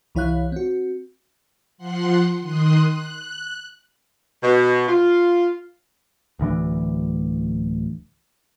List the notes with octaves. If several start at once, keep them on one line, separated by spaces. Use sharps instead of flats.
C2 E3 E4 C#5 F5 F#6
C4 F#4
F3 F#5 C6 F#6
D#3 C6 D#6 F#6
F#6
B2
F4
D1 D2 E3 D4